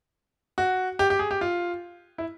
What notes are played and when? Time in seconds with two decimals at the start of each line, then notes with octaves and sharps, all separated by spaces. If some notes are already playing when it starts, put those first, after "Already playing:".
0.58 F#4
0.99 G4
1.10 G4
1.19 G#4
1.31 G4
1.41 F4
2.18 E4